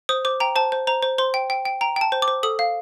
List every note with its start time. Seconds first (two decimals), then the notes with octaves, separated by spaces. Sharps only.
0.09 C5 D#6
0.25 C5 D6
0.40 G5 A#5
0.56 C5 A5
0.72 C5
0.87 C5 A#5
1.02 C5
1.18 C5 C6
1.34 G5
1.50 G5
1.65 G5
1.81 G5 A#5
1.96 G5 A5
2.12 C5
2.22 D6
2.28 C5
2.43 A4 D#6
2.59 F5